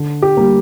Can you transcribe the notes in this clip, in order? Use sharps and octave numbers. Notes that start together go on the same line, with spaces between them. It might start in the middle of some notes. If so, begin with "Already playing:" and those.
Already playing: D3
G4
G3 A#3